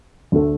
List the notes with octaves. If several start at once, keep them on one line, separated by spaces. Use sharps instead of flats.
D2 D3 A3